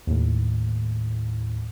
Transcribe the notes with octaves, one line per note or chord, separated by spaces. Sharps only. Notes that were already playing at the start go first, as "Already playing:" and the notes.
D#2 A2